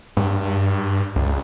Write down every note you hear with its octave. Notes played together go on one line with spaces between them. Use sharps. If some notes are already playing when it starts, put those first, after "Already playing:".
G2
C#2